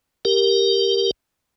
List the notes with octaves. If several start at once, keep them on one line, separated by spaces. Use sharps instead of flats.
G4 A#4